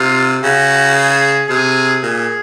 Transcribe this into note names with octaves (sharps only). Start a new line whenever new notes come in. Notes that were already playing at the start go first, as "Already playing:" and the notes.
Already playing: C3 F4
C#3 F#4
G#4
C3 G#4
A#2 G#4